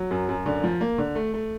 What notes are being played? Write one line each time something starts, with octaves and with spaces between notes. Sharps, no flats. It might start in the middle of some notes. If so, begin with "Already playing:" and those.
Already playing: F#3
F#2
F#2
D3
F3
A#3
D3
A3
A3